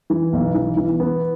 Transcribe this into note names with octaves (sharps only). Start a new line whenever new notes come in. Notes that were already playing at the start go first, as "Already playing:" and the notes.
E3
B1
E3
E3
B3